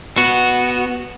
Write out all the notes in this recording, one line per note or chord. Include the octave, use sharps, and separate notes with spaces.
B3 F#4